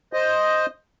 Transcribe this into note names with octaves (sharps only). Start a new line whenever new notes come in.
C5 D#5